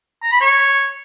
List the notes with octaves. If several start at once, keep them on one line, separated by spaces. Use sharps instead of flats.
A#5
B5
C#5